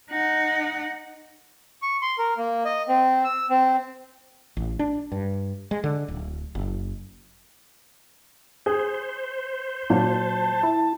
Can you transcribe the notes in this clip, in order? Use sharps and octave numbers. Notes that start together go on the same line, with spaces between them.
D#4 F#5
C#6
C6
A#4
A#3
D#5
C4
E6
C4
A1
D4
G2
G#3
D3
D1
F#1
G#4 C5
A#2 F#3 A5
E4